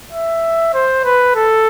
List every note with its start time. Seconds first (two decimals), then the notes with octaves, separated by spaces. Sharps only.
0.12 E5
0.74 C5
1.04 B4
1.36 A4